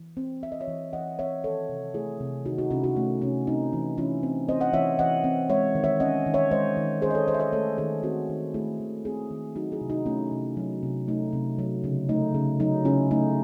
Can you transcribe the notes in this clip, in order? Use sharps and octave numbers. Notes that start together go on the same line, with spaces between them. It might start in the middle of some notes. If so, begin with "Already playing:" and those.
Already playing: E3
C4
C4 E5
D#5
C#5 E5
E3
E3 D#5 F#5
C4 C#5 E5
D#3 A4 C#5
C3
A3 E4 G#4
C3
D#3 D#4 F#4
D#4 F#4
C3 C#4 E4
D#4 F#4
A3 C#4
C3 C#4
C4 D#4
E3
E3 C#4 E4
C4
C4 C5 D#5
D#5 F#5
E3 C#5 E5
E3 D#5 F#5
C4
G#3 C#5 E5
D#3
C#5 E5
C#4 D#5 F#5
D#3
C#5 E5
G#3 C5 D#5
D#3
C#4 G#4 C5
D#5
A4 C#5
D#3 C5 D#5
E5
C5 D#5
A3 A4 C#5
D#3 G#4 C5
C4 F#4 A4
D#3
A3 E4 G#4
D#3
C4 E4 G#4
D#3
F#3 D#4 F#4
E4 G#4
C3
D#4 F#4
A3 C#4 E4
C3
F#3
C3
A3 D#4
C3
F#3
C#3
A3 D#4
C#3
F#3 D#4
C#3 C#4 E4
A3 D#4